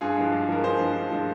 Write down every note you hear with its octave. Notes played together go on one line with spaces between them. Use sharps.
G2 F4 G#4
F3 G#3
G2
F3 G#3 A#4
G2 G#4 C5
F3 G#3
G2
F3 G#3